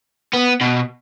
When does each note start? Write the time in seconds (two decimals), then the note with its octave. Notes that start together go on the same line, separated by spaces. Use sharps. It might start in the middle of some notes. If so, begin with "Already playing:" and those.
0.33 B3
0.61 B2